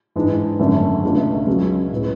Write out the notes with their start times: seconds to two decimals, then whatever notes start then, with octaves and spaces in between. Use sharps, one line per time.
0.16 G#2 E3 G#3 D4
0.59 G#1 F#2 D3 A3 C#4
1.03 C#2 B2 A3 D4
1.46 C#2 C#3 F#3 C#4 G#4
1.93 A2 G#3 B3